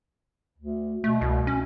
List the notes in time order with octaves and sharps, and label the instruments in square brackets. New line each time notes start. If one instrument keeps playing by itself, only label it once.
[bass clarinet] D2
[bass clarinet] B2 [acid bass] A3
[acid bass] C2
C#4